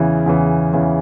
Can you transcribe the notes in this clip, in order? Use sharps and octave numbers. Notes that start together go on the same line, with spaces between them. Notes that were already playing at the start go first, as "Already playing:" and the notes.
Already playing: E2 C#3 E3
E2 C#3 E3
E2 C#3 E3